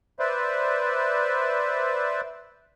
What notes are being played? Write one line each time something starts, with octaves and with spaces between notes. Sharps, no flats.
B4 C5 D5 E5